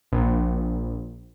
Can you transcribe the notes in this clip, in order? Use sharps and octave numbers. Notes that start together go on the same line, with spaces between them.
A#1